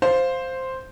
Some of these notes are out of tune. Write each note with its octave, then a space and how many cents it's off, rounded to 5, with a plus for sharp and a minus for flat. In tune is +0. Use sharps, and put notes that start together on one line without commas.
C5 +0 F5 +5